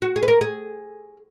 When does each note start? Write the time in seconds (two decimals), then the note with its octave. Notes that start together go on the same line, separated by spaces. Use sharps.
0.02 F#4
0.16 G#4
0.23 B4
0.28 A#4
0.41 G#4